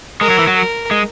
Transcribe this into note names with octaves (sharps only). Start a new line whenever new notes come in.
G#3 A#4
F#3
E3
F#3
A#4
G#3